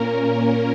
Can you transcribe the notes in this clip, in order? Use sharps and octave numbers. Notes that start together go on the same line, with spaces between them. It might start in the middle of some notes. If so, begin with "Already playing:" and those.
Already playing: A#2 A#3 C#4 A#4